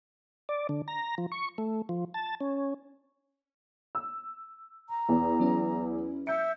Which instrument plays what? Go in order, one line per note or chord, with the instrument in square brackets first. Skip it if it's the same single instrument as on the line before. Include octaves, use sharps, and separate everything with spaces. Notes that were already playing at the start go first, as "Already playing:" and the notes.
[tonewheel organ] D5
D3
A#5
F3
C#6
A3
F3
A5
C#4
[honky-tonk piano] E6
[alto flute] A#5
[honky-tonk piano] E2
[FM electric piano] F#3 C#4 E4
[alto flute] E5 [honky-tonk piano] G6 C#7